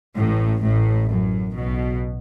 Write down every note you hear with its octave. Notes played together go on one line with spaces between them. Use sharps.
A1 A2
A1 A2
F#2
B1 B2